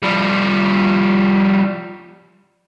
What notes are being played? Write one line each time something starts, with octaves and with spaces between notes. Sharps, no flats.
F3 G3